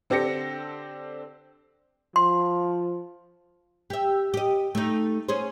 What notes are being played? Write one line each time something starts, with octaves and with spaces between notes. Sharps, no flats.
D3 C4 D4 G4 A#6 C#7
F3 C6
G4 E5
G4 D#5
A3 D#4
C#4 G#4 C5